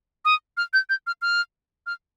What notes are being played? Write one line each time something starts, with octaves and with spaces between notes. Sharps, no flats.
D#6
F6
G6
G6
F6
F6
F6